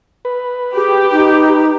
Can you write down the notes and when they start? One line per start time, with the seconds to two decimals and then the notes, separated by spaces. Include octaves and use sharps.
0.25 B4
0.77 G4 G#4
1.12 D#4